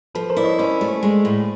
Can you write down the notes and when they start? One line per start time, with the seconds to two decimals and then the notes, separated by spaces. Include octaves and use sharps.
0.15 F3 A4 B4
0.30 A#4 C5
0.37 E4 D5
0.44 C#5 D#5
0.59 C#4 C5 D5
0.81 A3
1.03 G#3
1.25 A2